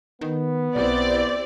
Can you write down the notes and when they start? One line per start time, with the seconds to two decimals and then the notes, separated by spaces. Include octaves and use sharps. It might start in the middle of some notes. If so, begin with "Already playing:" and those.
0.21 D#3 B3
0.76 B1 C4 E4 G4 D5